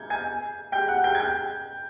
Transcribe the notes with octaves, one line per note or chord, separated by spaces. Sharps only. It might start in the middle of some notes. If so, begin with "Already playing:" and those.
Already playing: G6 G#6
G#5 G#6
G5 G6
F#5 F#6
G5 G6
G#6
G5 G6